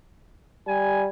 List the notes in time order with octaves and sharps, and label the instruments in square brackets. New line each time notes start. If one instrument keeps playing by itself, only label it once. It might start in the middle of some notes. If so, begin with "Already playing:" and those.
[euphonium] G3 [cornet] G#5